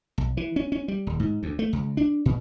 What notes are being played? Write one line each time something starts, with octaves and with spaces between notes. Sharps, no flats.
B1
E3
C#4
C#4
G3
D#1
G#2
D2
A3
C#2
D4
A#2